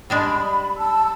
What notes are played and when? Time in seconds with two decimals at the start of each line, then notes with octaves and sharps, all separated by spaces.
0.10 G3 G#3 D4 B5
0.77 A5 E6